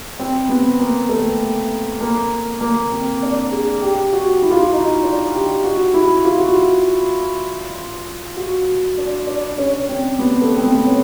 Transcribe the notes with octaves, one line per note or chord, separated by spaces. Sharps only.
C4
B3
A#3
A3
A#3
A#3
C4
D4
G#4
G4
F#4
E4
F4
E4
D#4
D4
G4
F#4
E4
F4
F#4
F4
F#4
D4
D4
C#4
C4
B3
A3
C4
B3
C#4